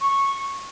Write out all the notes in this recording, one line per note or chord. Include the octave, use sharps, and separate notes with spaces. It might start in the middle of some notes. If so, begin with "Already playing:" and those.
C#6